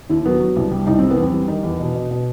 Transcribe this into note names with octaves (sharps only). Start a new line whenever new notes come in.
D#2 E4
F#3 B3
F#3
C2
G3
C2 D#4
G3 C4
B3
E2
C4
G3
D#3 D#4
E2
B2
B2
B2